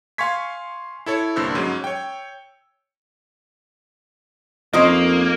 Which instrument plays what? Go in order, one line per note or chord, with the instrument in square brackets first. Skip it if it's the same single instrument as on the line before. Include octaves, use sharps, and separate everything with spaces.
[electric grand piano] F5 G#5 C6 C#6 G#6 B6
E4 A4 C#5
C2 G2 D3 A#3 C5 E6
G#2 F#3 G#3 C#4
C#5 G5
[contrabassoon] F2 [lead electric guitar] A#3 [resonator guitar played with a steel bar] C#4 D#4 C5 [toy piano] D#5 D#6